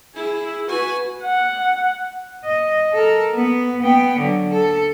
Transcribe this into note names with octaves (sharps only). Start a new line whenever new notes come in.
E4 G#4
F#4 B4 G#5
F#5
D#5
A4 A#4
B3
B3 G5
D3 F#3
A4